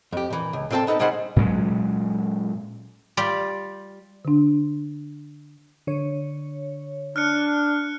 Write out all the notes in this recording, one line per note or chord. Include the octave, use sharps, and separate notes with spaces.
F2 G4
A#2 E3
C#2
A#2 A#3 C4 A4 G5 A5
B3 D#4 A4 B4
A#2 G3 D#4 G#4 C5 F#5
A#2 F#3 G#3 C#4
G3 F4 D5
D3 D4
D3 C#5
D4 F6 F#6 C#7